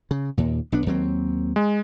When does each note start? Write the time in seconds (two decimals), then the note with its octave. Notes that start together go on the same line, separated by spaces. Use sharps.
0.11 C#3
0.37 D#2 A#2
0.72 B1 B3 D4
0.86 D#2 F#3 C4
1.56 G#3